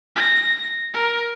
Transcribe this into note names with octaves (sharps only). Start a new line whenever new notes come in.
A#6
A#4